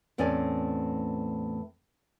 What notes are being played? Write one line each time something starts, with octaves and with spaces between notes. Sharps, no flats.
E2 A2 C4 C#4 D5 G#5